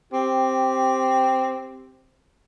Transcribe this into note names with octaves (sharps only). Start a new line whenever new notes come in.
C4 G4